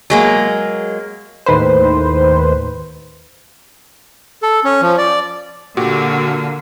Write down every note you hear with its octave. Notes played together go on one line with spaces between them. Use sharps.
F#3 G#3 A#3
D#2 A2 D#3 B4 C5
A4
C#4
F3
D5
A#2 D3 A#3 F#4 G4